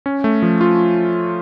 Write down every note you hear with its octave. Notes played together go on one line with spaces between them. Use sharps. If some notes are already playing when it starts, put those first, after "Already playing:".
C#4
A3
F3
F4